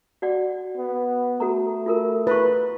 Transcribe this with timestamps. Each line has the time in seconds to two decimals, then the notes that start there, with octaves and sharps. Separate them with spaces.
0.22 F#4 D5 F#5
0.77 B3
1.40 A3 F#4 A4 A#5
1.86 F4 A4 A#4
2.27 E4 B4 C#6